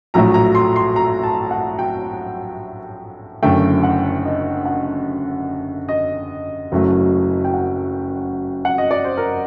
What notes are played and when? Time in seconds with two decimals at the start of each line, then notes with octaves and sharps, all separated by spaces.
0.14 A#1 A2 F#3 A3 A#5
0.34 A#5
0.55 C6
0.76 C6
0.96 A#5
1.23 A5
1.51 F#5
1.79 G5
3.43 F#1 F#2 D3 A3 G5
3.83 F#5
4.25 D#5
4.65 F#5
5.89 D#5
6.72 F#1 F#2 F#3 A3
7.44 G5
7.54 F#5
8.65 F#5
8.78 D#5
8.91 D5
9.04 C5
9.18 A#4